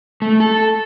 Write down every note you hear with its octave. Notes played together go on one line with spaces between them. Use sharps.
A3
A4